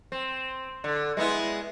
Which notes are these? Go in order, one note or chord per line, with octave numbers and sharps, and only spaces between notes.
C4
D3
G#3 B3 E4